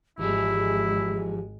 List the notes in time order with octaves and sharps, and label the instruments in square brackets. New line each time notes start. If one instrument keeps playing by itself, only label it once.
[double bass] G#1 G#3 [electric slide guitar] E3 F3 G#4 [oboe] E4 [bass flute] G4